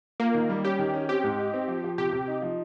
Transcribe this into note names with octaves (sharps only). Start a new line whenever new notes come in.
A#3 F4
D#3
G3
C#4 G4
D#3
C#4
C4 G4
G#2
D#4
C4
F3
F3
C3 G4
C3
D#4
F3